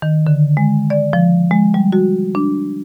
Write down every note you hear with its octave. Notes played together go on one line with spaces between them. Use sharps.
D#3
D3
G#3
D5
F3
G#3
G3
F#4
D4